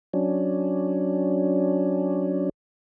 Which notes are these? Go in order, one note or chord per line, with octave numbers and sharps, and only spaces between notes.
F#3 C#4 D4